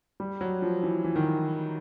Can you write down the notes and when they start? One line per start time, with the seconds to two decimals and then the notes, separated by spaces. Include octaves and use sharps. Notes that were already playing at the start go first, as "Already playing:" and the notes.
0.20 G3
0.41 F#3
0.62 F3
0.83 E3
1.04 E3
1.16 D#3